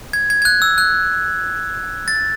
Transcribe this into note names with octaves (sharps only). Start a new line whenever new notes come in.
G#6
G#6
G#6
F#6
E6
F#6
A6